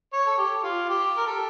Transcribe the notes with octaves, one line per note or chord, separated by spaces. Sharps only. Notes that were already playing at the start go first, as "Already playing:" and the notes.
C#5
A4
G4
F4
G4
A#4
A4